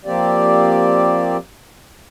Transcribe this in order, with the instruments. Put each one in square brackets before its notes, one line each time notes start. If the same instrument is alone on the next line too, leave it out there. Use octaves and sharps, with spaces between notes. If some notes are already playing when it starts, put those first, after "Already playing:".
[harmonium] F3 A#3 C4 G4 D5